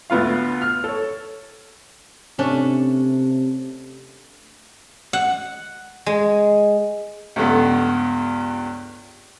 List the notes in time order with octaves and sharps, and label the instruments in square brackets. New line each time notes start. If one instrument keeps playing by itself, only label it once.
[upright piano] D2 A3 B3 F4 F5
F6
A4 C#5
[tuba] C3 [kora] A3 C#4 D4
[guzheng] F#5
G#3
[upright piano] C#2 G2 A3 B3